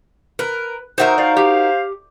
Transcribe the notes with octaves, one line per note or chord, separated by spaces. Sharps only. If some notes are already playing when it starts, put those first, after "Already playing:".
A#4 B4
D#4 F#4 A#4 C5 E5
C5 D5 F5
G4